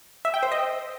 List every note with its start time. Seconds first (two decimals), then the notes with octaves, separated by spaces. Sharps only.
0.25 E5
0.34 G5
0.43 C5
0.52 D#5